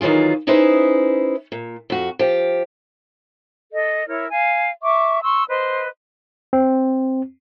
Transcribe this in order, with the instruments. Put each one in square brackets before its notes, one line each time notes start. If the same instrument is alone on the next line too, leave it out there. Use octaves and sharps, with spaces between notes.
[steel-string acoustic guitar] D#3 E3 F#3 F4 G#4
C#4 D#4 E4 G#4 B4 C5
A#2
F2 F#4
F3 G4
[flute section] A4 D#5
E4 A#4 C#5
F5 G#5
E5 C#6 D6
C6 C#6 E6
B4 C5 D#5
[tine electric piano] C4